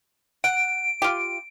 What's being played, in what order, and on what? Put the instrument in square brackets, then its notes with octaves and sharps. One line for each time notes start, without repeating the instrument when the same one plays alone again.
[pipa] F#5 [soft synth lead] D7
[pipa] F4 G4